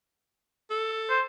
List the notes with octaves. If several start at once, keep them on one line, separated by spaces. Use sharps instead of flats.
A4
C5